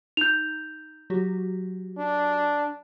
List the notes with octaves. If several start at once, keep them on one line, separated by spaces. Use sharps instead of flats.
D#4 G6 F7
F#3 F#4 G4
D4